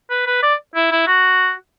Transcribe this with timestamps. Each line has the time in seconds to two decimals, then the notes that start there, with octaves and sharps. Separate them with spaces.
0.10 B4
0.26 B4
0.43 D5
0.75 E4
0.91 E4
1.07 F#4